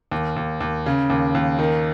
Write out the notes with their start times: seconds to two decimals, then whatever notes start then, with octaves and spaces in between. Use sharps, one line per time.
0.11 D#2
0.36 D#2
0.60 D#2
0.86 C#3
1.10 D#2
1.35 D#2
1.59 D#3